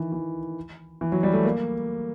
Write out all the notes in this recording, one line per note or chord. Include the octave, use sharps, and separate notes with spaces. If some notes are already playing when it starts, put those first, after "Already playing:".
Already playing: D#3 E3
E3
E3
F#3
G3
A3
A#3